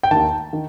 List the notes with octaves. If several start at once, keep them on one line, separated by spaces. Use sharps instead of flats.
G5
D#2 D#3 A5
D#3